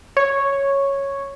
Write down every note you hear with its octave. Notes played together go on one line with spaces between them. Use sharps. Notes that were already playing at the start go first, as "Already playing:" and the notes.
C#5